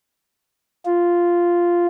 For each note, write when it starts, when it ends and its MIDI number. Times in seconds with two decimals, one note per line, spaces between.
0.85 1.87 65